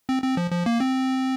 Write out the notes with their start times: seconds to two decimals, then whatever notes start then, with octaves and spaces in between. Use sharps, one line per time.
0.09 C4
0.23 C4
0.37 F3
0.51 F3
0.66 A#3
0.80 C4